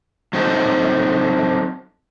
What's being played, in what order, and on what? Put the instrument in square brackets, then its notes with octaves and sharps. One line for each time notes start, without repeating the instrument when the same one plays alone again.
[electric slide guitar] F#3 C4 D#4 A4